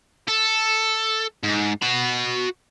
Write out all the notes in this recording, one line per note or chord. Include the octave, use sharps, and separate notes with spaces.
A4
G#2
F#4 B5